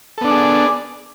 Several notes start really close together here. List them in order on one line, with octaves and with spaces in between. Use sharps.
A4 B3 D4 D5 G#4